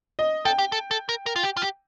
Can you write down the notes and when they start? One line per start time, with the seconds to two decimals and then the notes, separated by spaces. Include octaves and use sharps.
0.19 D#5
0.45 A4 G5
0.59 G4
0.72 A4
0.91 A4
1.09 A#4
1.26 A#4
1.36 F4
1.43 G4
1.57 F4
1.62 G4